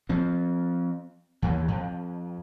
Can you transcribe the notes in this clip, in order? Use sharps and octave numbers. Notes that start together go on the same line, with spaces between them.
F3 C4
D#2 E3
F2